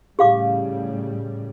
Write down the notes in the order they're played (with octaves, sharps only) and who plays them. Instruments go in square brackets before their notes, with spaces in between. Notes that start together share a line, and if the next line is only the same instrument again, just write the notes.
[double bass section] A2 C#3 G3 [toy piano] G4 F5 D6